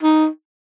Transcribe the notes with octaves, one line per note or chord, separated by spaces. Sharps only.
D#4